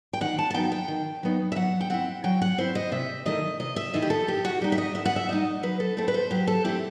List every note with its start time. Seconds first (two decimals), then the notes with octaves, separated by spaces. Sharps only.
0.13 G5
0.21 D#3 F#5
0.39 A5
0.50 A5
0.54 F#3 B3 D#4 G5
0.72 G5
0.88 D#3
1.23 F#3 B3 D#4
1.52 E5
1.56 F#3 F#5
1.81 G5
1.90 C4 E4 F#5
2.24 F#3 G5
2.42 F#5
2.58 C4 E4 C5
2.75 D#5
2.92 C3 E5
3.25 D#3 A3 E4 D#5
3.60 C3 D#5
3.76 E5
3.94 D#3 A3 E4 D#5
4.02 G4
4.10 A4
4.27 A2 G4
4.45 F#4
4.61 G3 D#4 G4
4.72 E5
4.78 D#5
4.95 A2 E5
5.05 F#5
5.16 E5
5.29 G3 D#4 D#5
5.63 F#3 B4
5.80 A4
5.97 A3 C4 E4 A4
6.08 B4
6.14 C5
6.31 F#3 G4
6.47 A4
6.65 A3 C4 E4 G4